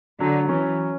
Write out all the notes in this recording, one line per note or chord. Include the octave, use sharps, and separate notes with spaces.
D3 F#3
E3 C#4